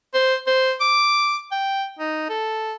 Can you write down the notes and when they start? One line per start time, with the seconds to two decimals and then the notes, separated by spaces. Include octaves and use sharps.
0.14 C5
0.47 C5
0.80 D6
1.52 G5
1.99 D#4
2.29 A4